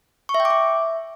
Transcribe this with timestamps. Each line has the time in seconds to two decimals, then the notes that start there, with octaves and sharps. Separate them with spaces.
0.29 C#6
0.34 E5
0.40 G5
0.45 D6
0.50 E5